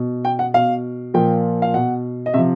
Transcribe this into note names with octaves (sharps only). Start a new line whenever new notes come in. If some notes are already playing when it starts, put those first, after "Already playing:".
Already playing: B2
G5
F#5
B2 F5
A#2 F3 G5
F5
B2 F#5
D#5
C3 F3 E5